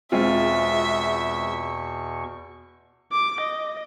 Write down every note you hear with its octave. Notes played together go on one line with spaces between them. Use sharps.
E2 B2 G#3 C4 F4 E5 C#6
D6
D#5